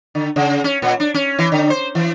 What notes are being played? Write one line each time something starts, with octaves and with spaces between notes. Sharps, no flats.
D3
C#3
C#4
A#2
D4
C#4
E3
D3
C5
E3